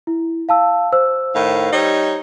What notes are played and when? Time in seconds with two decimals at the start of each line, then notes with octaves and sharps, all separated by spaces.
0.07 E4
0.49 F5 A5 E6
0.92 C5 E6
1.34 A2 D#3 F5
1.72 G3 D#4 C#5